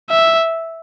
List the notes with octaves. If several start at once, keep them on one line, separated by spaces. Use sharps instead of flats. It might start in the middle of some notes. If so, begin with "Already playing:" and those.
E5